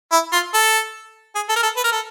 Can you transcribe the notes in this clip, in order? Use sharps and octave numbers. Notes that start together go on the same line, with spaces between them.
E4
F4
A4
G#4
A4
A#4
A4
B4
A#4
A4